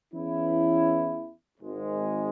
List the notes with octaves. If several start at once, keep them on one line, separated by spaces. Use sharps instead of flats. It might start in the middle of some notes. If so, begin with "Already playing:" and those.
E2 E3 C#4 E4
G#1 G#2 G#3